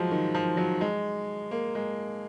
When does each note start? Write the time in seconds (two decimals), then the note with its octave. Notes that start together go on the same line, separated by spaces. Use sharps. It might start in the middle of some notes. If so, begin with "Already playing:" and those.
Already playing: F3 F#3 G#3
0.11 D#3
0.35 F3
0.57 F#3
0.81 G#3
1.51 A#3
1.75 G#3